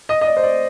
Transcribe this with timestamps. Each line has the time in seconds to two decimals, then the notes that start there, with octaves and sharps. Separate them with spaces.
0.09 D#5
0.21 D#5
0.26 D5
0.36 C5
0.43 D5